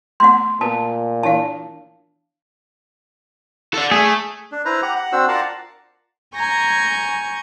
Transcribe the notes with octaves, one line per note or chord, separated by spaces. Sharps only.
A3 B3 F#5 C6
A#2 B3 F4 B4 A5
E3 D4 E4 F5 A5
A4 D5
A3 G#4
D4
E4 B4 C5 A#5
G4 F#5 A#5
F#5
C4 D4 F#4 C5 E6
F4 A#4 D5 F5 F#5 A5
G#5 A#5 C#6 G6 G#6